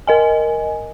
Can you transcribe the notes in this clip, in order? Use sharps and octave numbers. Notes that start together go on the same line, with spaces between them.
A#4 D#5 G#5